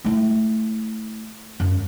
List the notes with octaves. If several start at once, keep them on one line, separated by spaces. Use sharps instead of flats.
A3 E4
F#2